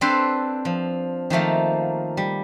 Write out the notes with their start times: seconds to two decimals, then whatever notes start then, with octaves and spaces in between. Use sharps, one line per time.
0.01 C4 D4 A4 B4 C5
0.65 F3
1.30 D#3 F3 A3 A#3
2.17 G3